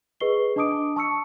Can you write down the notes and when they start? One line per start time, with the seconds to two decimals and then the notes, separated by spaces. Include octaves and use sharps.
0.20 G#4 B4 D#5 C#6 C7 G7
0.56 D4 D#5 A5 D6 D#6 D7
0.96 A5 C#6 E6 C#7